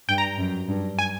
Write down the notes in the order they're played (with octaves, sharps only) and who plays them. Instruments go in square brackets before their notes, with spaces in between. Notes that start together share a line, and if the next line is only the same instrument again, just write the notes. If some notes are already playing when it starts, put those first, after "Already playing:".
[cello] G2 [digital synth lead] G5
[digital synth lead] A#5
[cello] F#2
G2
[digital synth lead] G#5